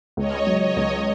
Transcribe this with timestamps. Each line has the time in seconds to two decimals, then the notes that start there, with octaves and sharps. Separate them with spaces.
0.17 C#2 C#5 D#5
0.47 F#3
0.61 C#5 D#5
0.76 C#2